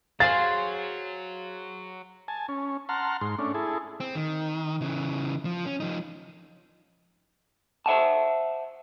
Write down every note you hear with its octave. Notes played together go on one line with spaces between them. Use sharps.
F#3 G#4 C5 F5 C6 A6
G#5 A5
C#4
F#5 A5 A#5 C6 F6
G#2 C6
A3 C#4 D4
E4 G#4 A4
C4
D#3
C#3 E3
F3
C#4
F3 D#4
C5 E5 F#5 A5